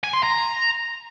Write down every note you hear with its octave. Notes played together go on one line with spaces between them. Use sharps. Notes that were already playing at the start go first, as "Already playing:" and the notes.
G#5
C6
A#5